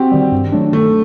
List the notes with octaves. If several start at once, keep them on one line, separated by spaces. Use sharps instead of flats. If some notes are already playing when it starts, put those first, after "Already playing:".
Already playing: C4 F#4 G4
D#3 G3
G2
F#3 A3 D4
D#3 A3